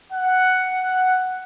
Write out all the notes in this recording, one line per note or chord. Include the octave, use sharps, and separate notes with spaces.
F#5